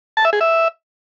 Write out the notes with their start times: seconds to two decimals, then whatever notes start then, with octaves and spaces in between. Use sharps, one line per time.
0.17 A5
0.25 E5
0.33 G#4
0.41 E5